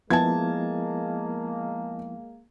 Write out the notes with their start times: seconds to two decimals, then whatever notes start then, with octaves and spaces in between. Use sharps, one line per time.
0.10 F3 G#3 A#3 B3 E4 A5 G#6